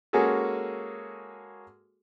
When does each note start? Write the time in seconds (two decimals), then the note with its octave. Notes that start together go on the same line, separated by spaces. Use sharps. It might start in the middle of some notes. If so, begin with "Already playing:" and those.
0.13 G#3 A#3 C#4 F#4 G#4 A4